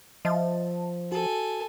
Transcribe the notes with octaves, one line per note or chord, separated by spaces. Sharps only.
F3 D#5 E5 A5
F#4 A4 G#5